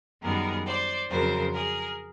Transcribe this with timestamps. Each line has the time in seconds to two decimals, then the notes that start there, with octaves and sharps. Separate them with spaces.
0.22 F#2 D#3 G3 B3 G#4 A#4
0.65 C5 D5
1.09 F2 C#3 F#3 A#4 C5
1.53 G#4 A#4